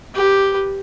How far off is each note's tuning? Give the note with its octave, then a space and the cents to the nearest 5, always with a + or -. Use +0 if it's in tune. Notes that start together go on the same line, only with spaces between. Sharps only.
G4 +0 B4 +0